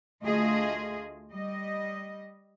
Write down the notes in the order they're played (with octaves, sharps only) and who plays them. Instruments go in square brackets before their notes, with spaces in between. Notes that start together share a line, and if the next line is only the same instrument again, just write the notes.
[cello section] D2 A3 F4 G#4 D#5
G3 D#5